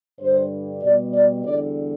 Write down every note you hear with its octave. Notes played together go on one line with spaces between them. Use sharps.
G2 D3 G3 C5
B2 G3 D5
D5
E2 D3 G3 D5